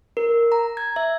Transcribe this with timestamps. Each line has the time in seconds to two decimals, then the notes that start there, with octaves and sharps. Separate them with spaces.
0.17 A#4
0.52 A#5
0.77 G#6
0.96 E5